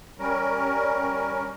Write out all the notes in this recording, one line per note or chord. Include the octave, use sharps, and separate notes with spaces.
G3 C#4 A#4